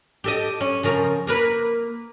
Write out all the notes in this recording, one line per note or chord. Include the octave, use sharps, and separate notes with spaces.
G4 A4 D#5
C#4
C#3 F3 A#4
A#3 A#4 B4